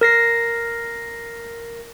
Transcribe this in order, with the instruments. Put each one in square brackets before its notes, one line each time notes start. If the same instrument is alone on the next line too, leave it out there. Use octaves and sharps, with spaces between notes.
[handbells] A#4 A#6 C7